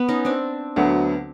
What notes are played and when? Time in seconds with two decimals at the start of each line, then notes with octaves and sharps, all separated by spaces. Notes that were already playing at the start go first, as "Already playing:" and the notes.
Already playing: B3
0.08 C#4 D#4
0.25 C4 D4
0.76 D2 D3 F#3 B3